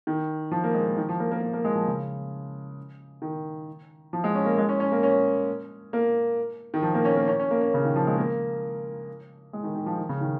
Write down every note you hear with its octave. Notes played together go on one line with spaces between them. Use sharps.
D#3
F3
A#3
G#3
A#3
D#3
F3
A#3
A#3
A#3
A#3
G#3
F3
C#3
D#3
F3
G#3
C#4
A#3
G#3
C#4
C#4
A#3
C#4
A#3
D#3
F3
A#3
C#4
A#3
C#4
C#4
A#3
C#4
C#3
D#3
F3
G#3
A#3
G#3
D#3
D#3
F3
D#3
C#3
D#3